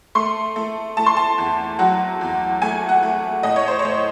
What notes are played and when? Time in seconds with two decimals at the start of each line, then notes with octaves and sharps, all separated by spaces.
0.15 A3 C6
0.56 A3
0.97 A3 A5
1.06 C6
1.17 A5
1.38 E2
1.79 F#3 F#5
2.21 E2
2.62 A3 G#5
2.89 F#5
3.03 A3
3.43 A2 D#5
3.56 C#5
3.68 C5
3.79 C#5
3.85 A2